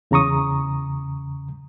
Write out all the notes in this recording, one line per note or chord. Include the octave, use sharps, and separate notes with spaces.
E2 C#3 A#5 C#6 D#6